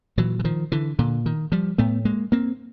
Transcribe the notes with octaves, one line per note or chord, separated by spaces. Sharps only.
A#2 E3 F#3
E3
D#3 F3
D3 E3
A#2 D3
D#3
F3 G3
A2 A3 B3
G#3 A#3
A#3 C4